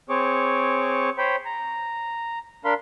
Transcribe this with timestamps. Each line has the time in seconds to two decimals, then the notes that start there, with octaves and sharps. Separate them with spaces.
0.09 C4 G#4 C#5 C#6 D6
1.18 C5 C#5 G5 B5
1.45 A#5
2.65 D4 A#4 F5 B5 C6